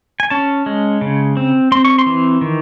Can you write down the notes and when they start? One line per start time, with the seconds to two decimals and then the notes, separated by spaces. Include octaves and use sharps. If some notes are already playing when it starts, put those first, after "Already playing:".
0.20 G#5
0.30 C#4 A5
0.66 G#3
1.01 C#3
1.37 C4
1.72 C4 C6
1.85 C#6
1.98 C6
2.06 E3
2.41 D#3